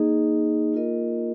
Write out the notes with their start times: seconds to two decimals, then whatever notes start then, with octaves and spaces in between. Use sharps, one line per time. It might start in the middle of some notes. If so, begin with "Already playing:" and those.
Already playing: A#3 D#4 G#4 D#5
0.73 A#3 F4 A#4 D#5